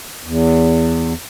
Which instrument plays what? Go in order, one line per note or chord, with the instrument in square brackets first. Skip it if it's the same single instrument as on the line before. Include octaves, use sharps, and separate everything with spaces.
[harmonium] E2